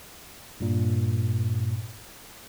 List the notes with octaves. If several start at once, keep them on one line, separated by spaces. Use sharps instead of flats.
G2 A#2